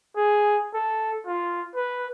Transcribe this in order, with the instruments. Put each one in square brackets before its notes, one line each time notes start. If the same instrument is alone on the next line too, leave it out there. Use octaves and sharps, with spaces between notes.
[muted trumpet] G#4
A4
F4
B4